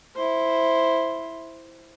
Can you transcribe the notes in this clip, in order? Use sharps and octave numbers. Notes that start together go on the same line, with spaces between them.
E4 C5